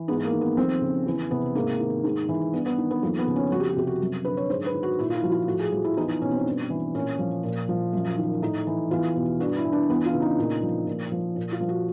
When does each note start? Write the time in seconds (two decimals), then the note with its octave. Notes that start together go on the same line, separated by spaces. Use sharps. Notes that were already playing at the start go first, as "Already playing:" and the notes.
Already playing: E3
0.08 G#2 B3
0.24 A#3
0.33 D#3
0.41 B3
0.57 F2 C4
0.81 C#3
1.07 E2
1.31 C3 B3
1.55 G#2 A#3
1.80 D#3
2.04 G#2
2.29 E3
2.54 G2 B3
2.66 B3
2.78 D#3
2.91 B3
3.02 F2 A#3
3.19 B3
3.27 C#3
3.36 C#4
3.52 F2 F#4
3.60 G4
3.69 F#4
3.76 C3 G4
3.87 F#4
4.01 F#2
4.25 D3 B4
4.37 C#5
4.50 G#2 C5
4.66 B4
4.74 D#3
4.83 F#4
4.99 A#2 E4
5.10 F4
5.15 E4
5.23 F3 F#4
5.32 F4
5.48 A2 F#4
5.59 G#4
5.72 F3 F#4
5.84 E4
5.97 E2 D#4
6.09 D#4
6.22 B2 C#4
6.33 C4
6.46 G2
6.70 E3
6.95 A#2 C#4
7.19 F3
7.44 A#2
7.69 F3
7.93 F#2
8.18 D#3
8.42 A2 D#4
8.67 E3
8.91 E2 F4
9.16 B2
9.40 G2 F#4
9.57 E4
9.65 E3
9.73 D4
9.89 E2 B3
10.06 F4
10.14 C#3
10.22 D#4
10.38 A#2
10.63 F3
10.87 A#2
11.12 F3
11.36 A#2
11.52 F4
11.61 F3
11.69 F#4